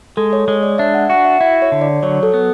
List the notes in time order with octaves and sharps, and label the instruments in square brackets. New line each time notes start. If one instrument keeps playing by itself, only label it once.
[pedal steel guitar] G#3 [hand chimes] A4
[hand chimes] C#5
[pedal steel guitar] G#3 [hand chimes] C#5
[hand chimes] D5
[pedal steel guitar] D4 [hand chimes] E5
[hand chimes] F#5
[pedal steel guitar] F#4 [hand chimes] F#5
[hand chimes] E5
[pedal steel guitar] E4 [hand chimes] E5
[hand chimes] C#5
[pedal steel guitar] D3
[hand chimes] D5
[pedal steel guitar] F#3 [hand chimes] C#5
[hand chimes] A4
[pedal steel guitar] B3